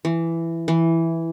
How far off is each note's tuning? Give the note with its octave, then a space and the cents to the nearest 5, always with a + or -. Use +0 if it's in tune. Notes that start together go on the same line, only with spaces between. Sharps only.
E3 +10
E3 +0